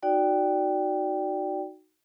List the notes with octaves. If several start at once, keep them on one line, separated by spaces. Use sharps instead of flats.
D#4 F#4 D5 G5